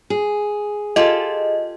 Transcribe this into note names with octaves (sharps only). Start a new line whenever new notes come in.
G#4
F4 G4 A4 D#5